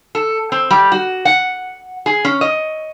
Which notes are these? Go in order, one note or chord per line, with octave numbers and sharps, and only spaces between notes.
A4
C4
G3
F#4
F#5
G#4
C#4
D#5